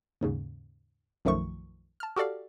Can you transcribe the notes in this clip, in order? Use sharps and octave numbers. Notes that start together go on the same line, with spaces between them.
D#2 G#2 C#3
B1 F#2 D#3 F3 A3 C#6
A5 F6
F#4 G4 A4 D5 F5